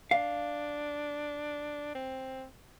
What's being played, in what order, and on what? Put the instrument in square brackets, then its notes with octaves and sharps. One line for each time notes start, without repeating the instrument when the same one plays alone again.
[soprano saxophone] D4 [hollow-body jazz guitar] F5
[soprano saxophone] C4